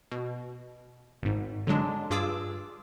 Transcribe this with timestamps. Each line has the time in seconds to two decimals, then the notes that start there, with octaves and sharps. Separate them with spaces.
0.12 B2
1.22 G#1 G#2
1.67 D3 F#3 G#3 D4
2.10 G2 F4 G#4 D6 E6